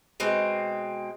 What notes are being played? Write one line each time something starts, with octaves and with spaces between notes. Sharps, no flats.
B2 G#3 C4